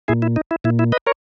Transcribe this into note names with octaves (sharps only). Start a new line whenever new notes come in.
A#2 E4 G#4
E4
D#4
E4
A#2 E4
E4
B4 D#5
A#4 C#5